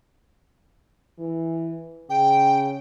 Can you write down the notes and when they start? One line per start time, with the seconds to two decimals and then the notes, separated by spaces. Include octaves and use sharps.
1.19 E3
2.10 C#3 G5